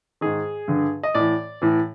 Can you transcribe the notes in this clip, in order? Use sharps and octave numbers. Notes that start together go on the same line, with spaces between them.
G#2 D#3 G#4
G2 D3
D#5
A2 E3 D5
A2 E3